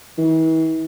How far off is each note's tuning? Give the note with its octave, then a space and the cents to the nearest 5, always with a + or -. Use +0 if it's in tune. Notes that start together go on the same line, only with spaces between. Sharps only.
E3 -40